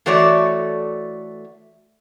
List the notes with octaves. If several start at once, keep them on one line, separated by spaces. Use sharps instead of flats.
E3 A3 F#4 A4 C#5 D5